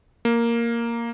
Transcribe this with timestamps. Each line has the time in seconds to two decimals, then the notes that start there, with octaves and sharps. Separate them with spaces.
0.25 A#3